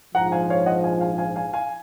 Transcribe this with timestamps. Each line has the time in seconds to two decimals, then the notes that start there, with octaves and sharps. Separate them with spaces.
0.15 A#1 G#2 F3 F#5 A#5
0.32 F5 G#5
0.50 C#5 F5
0.66 D#5 F#5
0.84 F5 G#5
1.01 F5 G#5
1.18 F5 G#5
1.36 F5 G#5
1.53 F5 G#5